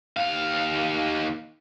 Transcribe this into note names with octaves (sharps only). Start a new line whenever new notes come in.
D#2 F5